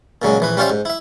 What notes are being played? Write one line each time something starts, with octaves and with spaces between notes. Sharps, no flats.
A#2 C#3 F#3 G#3
A#1 E3 B4
G3 C#4 F4 C5 C#5 E5
G#2
E4 E5